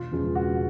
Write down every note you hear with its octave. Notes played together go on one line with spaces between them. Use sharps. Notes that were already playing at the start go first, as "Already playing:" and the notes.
Already playing: E1 F4
E2 C#3 F3 G#3
E1 F#4